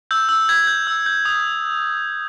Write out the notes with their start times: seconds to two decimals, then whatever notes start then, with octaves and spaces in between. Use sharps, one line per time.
0.11 E6 G6
0.29 E6
0.48 G6 G#6
0.67 G6
0.87 E6
1.06 G6
1.25 D#6